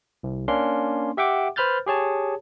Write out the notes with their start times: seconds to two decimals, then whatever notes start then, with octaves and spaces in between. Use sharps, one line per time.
0.23 C2
0.48 A#3 C#4 D4 C6
1.17 G4 E5 F#5 G5 D6
1.56 B4 C5 B5 F6 G6 A6
1.86 G4 G#4 C#5 A5